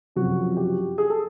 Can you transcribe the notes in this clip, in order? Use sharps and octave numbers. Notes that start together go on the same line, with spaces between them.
F#1 F2 C3 F3 F#4
G4
G#4
A4